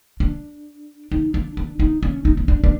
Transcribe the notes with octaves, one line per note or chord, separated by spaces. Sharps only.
D4
D#4
D4
D4
D#4
C#4
D#4
C#4
D4
D4